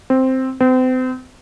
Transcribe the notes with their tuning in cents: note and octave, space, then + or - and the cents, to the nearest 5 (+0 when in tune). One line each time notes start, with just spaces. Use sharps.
C4 +0
C4 -35